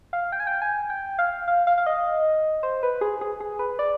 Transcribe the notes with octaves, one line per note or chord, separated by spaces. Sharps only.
F5
G5
G#5
G5
G#5
G5
F5
F5
F5
F5
D#5
C5
B4
G#4
G#4
G#4
B4
D5